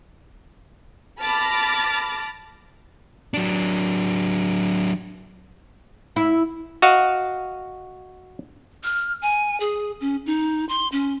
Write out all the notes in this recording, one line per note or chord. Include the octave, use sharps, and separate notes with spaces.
A5 B5 D6 F6 A6 A#6
F#3 D4
E4
F#4 D#5 F5 F#5
F6
G#5
G#4
C#4
D#4
C6
C#4